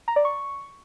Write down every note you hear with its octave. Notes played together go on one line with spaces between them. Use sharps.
A#5
D5
C#6